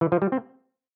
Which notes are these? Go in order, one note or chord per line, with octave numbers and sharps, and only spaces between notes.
E3
F3
G3
C4